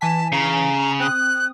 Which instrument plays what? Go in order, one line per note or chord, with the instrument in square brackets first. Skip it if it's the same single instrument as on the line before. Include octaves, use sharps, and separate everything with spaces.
[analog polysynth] E3 G#5 B6 [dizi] A5
[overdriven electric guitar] C#3 [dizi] A#5
[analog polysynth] C4 D#6 [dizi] F#6